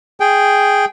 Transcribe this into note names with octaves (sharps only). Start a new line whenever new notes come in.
G#4 G5